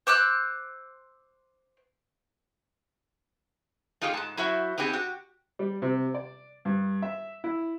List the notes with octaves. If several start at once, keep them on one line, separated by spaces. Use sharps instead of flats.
C5 D6 E6 F#6
A3 D#4 F4 G4 G#4
G#2 A5
F#3 E4 F#4 C5 E5
B3 C4 D#4 G4 G#4
F#4 G4
G3
C3
D5
G2
E5
E4